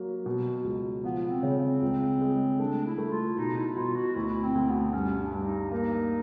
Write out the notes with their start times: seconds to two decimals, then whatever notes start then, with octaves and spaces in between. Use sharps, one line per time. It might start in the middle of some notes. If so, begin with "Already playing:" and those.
Already playing: F#3 A#3
0.26 B2
0.64 C#2
1.04 F3 B3
1.30 C4
1.43 C#3
1.56 C4
1.82 C#2
2.21 G#3
2.59 A3 D4
2.86 E4
2.98 A3
3.11 F4
3.38 B2 D#4
3.57 E4
3.76 B2 F4
3.96 F#4
4.15 D2 E4
4.42 C4
4.55 D2
4.68 B3
4.93 G2 C#4
5.19 D4
5.32 G2
5.45 D#4
5.71 A#3 D#4